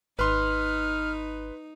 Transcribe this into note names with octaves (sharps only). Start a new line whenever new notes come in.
G#1 D#4 B4 C6 F6